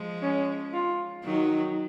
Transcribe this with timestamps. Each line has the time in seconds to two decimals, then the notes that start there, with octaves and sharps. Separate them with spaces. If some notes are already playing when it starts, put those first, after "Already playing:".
Already playing: F3 G#3
0.22 C#4
0.73 F4
1.24 D#3 F#3 D#4